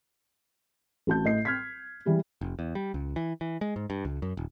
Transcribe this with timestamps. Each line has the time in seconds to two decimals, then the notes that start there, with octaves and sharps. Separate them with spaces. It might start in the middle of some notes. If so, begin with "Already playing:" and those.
1.07 A1 F#4 A5 G6
1.25 A2 D#5 C7
1.45 F6 G#6 B6
2.05 E3 G3 G#3
2.41 F1
2.59 E2
2.75 G3
2.94 C#2
3.16 E3
3.41 E3
3.61 G#3
3.76 G#2
3.90 G2
4.05 C#2
4.22 F#2
4.37 D#1